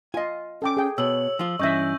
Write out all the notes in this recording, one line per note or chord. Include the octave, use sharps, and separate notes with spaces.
F4 D#5 G#5
C#4 A4 G5 D6
G#4 G5
B2 C#5 E6 F#7
F3 F4
G2 E3 C#4 D#5 E5 C#6 G6 A#6